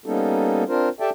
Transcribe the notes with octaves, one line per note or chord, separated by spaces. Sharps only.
G3 A#3 B3 C#4 D#4 A4
C4 D4 F4 A#4 C5
G4 A4 D5 E5 G5 A5